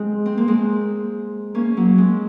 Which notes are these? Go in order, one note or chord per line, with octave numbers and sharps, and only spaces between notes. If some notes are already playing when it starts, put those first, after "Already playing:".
Already playing: G#3 C4
C4
A#3
G#3 C4
A#3 C#4
F#3 A#3
G#3 C4